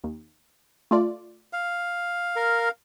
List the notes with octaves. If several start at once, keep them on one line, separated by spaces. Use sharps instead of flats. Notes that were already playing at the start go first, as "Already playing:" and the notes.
D#2
A3 F4 D5
F5
A#4